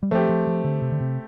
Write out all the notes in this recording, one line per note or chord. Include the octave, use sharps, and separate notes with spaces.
G3
F3 A3 C4 G4
F3
F3
D3
C3
D3
C3